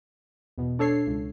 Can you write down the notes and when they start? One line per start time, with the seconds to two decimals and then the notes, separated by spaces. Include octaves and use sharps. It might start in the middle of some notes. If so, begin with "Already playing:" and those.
0.58 E2 B2
0.79 D4 A4 C#5 C7
1.07 C#2